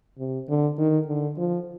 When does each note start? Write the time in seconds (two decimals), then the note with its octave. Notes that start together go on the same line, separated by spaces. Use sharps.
0.18 C3
0.48 D3
0.78 D#3
1.08 D3
1.37 F3